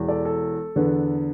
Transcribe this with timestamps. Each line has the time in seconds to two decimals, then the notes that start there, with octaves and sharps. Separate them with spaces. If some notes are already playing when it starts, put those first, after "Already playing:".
Already playing: E1 E2 E3
0.08 A4 D5
0.25 A4
0.76 E2 D3 B3